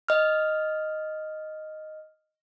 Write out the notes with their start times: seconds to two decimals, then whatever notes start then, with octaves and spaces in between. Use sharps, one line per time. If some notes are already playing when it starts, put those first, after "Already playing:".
0.09 D#5 F6